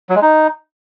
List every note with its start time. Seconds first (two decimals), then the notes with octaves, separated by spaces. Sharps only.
0.09 F#3
0.16 G#3
0.22 D#4